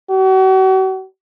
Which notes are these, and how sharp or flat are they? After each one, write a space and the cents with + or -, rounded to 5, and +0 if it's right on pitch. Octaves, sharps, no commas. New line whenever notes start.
F#4 +40